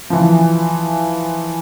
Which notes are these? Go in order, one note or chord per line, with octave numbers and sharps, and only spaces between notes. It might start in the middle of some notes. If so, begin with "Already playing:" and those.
E3 F3